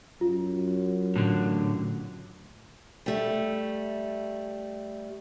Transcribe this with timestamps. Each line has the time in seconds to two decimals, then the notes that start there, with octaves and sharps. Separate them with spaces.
0.21 F#2 F4
1.16 A1 A2 D3
3.06 G3 A3